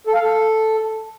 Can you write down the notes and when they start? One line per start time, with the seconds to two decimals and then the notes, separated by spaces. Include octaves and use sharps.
0.07 A4
0.14 F5
0.22 A4